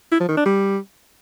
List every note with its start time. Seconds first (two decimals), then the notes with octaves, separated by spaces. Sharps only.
0.12 E4
0.20 F3
0.29 D#3
0.37 D4
0.46 G3